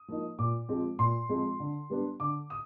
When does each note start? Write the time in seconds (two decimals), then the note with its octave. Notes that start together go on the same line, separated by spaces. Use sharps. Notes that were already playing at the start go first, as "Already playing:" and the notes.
Already playing: D#6
0.08 F3 A#3 D#4
0.39 A#2 D6
0.69 F3 G#3 C4 F4
0.99 A#2 C6
1.29 F3 G#3 C4 F4
1.60 D3
1.90 G3 B3 D4
2.20 D3 D6
2.50 D#6